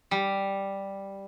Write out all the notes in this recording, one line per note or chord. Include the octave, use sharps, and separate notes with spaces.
G3